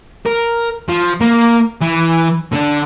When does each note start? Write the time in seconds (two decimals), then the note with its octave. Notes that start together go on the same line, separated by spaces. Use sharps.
0.26 A#4
0.89 F3
1.21 A#3
1.82 E3
2.53 D3 D4